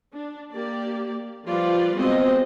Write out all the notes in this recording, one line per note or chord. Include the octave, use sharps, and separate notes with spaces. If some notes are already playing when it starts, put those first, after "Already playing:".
D4
A#3 G4 D5
F3 G3 F4 B4 D5
G#3 B3 C4 F#4 C5 D#5